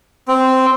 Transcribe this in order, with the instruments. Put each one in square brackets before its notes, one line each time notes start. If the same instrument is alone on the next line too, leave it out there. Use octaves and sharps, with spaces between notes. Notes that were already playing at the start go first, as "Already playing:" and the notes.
[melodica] C4